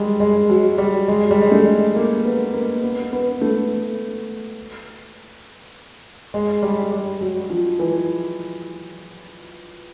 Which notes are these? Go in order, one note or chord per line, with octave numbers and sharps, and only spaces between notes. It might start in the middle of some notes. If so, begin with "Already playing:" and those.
Already playing: G3 G#3
G#3
F#3
G3
G#3
G3
G#3
A3
A#3
B3
A#3
B3
B3
A3
G#3
G3
G3
F#3
F3
E3